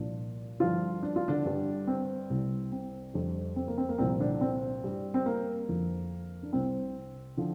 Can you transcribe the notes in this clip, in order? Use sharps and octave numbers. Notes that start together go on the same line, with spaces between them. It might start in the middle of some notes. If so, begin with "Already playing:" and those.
Already playing: C2 A#2 F3 D4
G2 D3 F3 F4
D4
F4
D3 D4
G2 D3 G3
C4
C2 C3 G3
C4
F2 D3 G3
C4
A#3
C4
A#3
C2 A#2 F3 C4
D3 D4
C4
G2 G3
C4
A#3
F2 D3 F3
D4
C2 C3 G3 C4
D3 F3